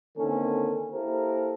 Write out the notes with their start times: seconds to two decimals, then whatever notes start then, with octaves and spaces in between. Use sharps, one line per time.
0.17 D3 D#3 A#3 C4 C#4 A4
0.92 A#3 E4 G4 A4 A#4 C5